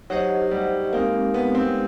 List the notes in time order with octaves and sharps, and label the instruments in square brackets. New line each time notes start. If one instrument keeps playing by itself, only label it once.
[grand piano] F#3 [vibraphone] D#4 G4 C5 D#5 F#5
[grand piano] G3
[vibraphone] G#3 C4 D#4 G4 [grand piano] A#3
[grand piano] B3
C4